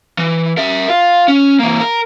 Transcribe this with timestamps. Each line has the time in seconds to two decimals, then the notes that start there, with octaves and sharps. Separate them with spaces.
0.18 E3
0.57 A#4 E5
0.89 F4
1.28 C#4
1.59 E3 A#3
1.81 A#4